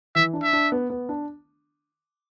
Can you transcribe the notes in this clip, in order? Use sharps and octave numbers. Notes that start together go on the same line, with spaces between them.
E3 E5
D4
E5
D4
B3
B3
D4